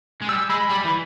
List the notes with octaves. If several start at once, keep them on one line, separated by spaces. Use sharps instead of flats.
G#3
G3 E6
G#3 B5
G3 B5
E3